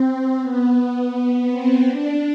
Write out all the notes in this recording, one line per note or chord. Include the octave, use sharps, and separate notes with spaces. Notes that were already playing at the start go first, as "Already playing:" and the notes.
Already playing: C4
B3
B3
C4
D4